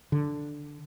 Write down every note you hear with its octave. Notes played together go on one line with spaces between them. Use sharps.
D3